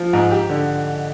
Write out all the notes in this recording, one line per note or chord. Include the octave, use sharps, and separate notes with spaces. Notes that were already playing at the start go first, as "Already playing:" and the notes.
Already playing: F3
G#2
G4
D3